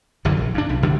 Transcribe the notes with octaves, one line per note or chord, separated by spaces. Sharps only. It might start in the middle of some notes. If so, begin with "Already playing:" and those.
G1 F#2 D3 E3
A#1
G2 D4
B1
D2 D3 G3